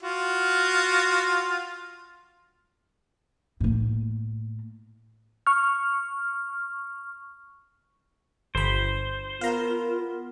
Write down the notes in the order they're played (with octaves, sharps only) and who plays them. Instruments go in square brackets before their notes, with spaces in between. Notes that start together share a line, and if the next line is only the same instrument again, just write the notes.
[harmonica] F4 F#4
[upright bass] A2 A#3
[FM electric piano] C#6 F6
[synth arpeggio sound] G1 B5 [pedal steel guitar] C5
[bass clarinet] B3 [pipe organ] F4 A#4 [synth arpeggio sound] F5 A#5